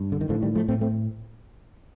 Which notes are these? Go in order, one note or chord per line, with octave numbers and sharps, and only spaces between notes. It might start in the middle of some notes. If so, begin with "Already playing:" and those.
Already playing: G2
D3
D#3
A2 D3 F3
D#3 G3
F3 A3
A2 A3 C4
A3 C4